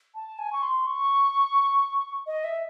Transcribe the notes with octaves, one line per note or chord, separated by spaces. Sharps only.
A5
G#5
C#6
C6
C#6
D#5
E5